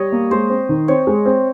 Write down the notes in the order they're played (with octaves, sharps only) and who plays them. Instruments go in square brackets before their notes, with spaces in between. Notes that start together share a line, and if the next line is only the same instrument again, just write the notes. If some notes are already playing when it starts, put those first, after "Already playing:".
Already playing: [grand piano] G3 [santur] C#5 D#5
[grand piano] A#3
[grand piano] G#3 [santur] C5
[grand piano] C4
D#3
[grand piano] C4 [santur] C#5
[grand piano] G#3
C4